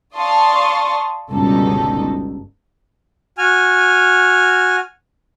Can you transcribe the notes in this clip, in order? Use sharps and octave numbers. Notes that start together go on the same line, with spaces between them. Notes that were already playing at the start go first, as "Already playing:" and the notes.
D5 F5 A5 C6 C#6 D#6
G1 C#2 G2 B2 D#4 A4
F#4 G#5 F6